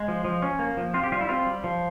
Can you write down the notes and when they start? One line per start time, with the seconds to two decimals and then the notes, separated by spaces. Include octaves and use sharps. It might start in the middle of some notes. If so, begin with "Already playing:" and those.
Already playing: G#3
0.08 F3
0.25 F3
0.42 C#4
0.59 A#3
0.77 F3
0.94 C4 F4
1.04 G4
1.12 G3 F4
1.21 E4
1.29 C4 F4
1.47 G3
1.64 F3